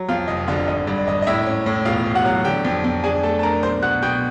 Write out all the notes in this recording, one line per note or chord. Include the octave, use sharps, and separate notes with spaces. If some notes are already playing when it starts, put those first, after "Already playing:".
Already playing: F#3
F2 F4 F5
F1 D#5
D3 F4 F5
G#1 D#5
G2 D5
G#1 D#5
D#5
A2 E4 E5
C#4
A2
E1 F4 F5
E1
F#4 F#5
F#3
D3 G4 G5
F2
F2
D4 G#4 G#5
A3 A4 A5
A5
D4 A#4 A#5
B1 C5 C6
B2 F#5 F#6
B2 G5 G6